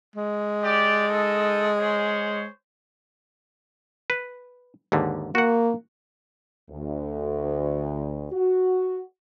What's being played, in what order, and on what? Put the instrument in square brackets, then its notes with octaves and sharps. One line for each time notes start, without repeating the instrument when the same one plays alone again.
[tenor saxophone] G#3
[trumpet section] G4 D5
D#4 A4
G#4 C5 C#5
[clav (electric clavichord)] B4
D#2 G#2 D3
[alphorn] A#3 [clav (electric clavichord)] F#4 F#5
[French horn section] D2
F#4